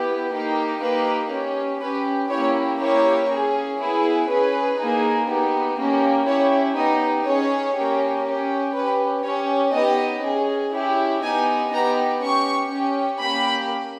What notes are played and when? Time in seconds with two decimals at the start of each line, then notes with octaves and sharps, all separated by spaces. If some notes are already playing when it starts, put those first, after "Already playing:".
Already playing: B3 E4 G4
0.32 A#3 D#4 G4
0.81 A#3 D#4 G4 B4
1.31 C#4 G4
1.81 C#4 G4 B4
2.30 A#3 C#4 E4 G4 C#5
2.80 A#3 E4 G4 C#5
3.29 C#4 G#4
3.79 B3 E4 G#4
4.28 C#4 G#4 B4
4.79 A#3 D#4 G#4
5.28 B3 D#4 G4
5.77 A#3 C#4 G4
6.26 C#4 E4 G4 C#5
6.76 B3 D#4 G4 D#5
7.26 C#4 G#4 C#5
7.76 A#3 C#4 G4
8.25 C#4 G4
8.74 C#4 G4 B4
9.24 C#4 G4 C#5
9.74 B3 D#4 G4 D#5
10.23 C#4 G#4
10.73 C#4 E4 G4
11.22 B3 D#4 G4 G#5
11.72 B3 D#4 G4 A#5
12.22 C#4 G4 C#6
12.71 C#4 G4
13.20 A#3 C#4 G4 B5